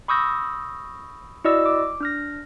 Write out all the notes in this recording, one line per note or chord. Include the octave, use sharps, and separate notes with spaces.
B5 C#6 D#6 E6 G6 A#6
E4 F#4 D5 D#5 E6
D6
D4 F6 A#6